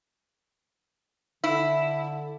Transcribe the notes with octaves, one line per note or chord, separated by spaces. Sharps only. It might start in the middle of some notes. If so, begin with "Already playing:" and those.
D3 E4